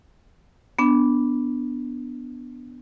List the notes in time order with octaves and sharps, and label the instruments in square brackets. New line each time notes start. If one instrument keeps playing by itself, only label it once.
[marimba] B3 D4